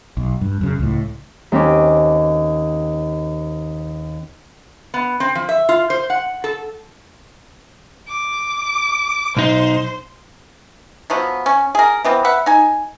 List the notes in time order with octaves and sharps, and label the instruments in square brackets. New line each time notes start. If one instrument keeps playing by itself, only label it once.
[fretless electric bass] B1
G2
F#2 C#3
C#2 A2
[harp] D#2 C4 C#4 D6
[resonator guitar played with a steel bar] B3
C4
F3
E5
F4
C5
F#5
A4
[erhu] D6
[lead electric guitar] B1 D#4 [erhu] C5
[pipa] F3 F#3 B3
C#4
G#4 A#4
E3 B3 C4
B4 E5 F#5
D#4 G#5